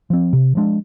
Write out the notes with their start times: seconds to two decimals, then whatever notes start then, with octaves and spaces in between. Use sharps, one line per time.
0.10 F3 C4
0.33 C3
0.55 F3 G#3 D4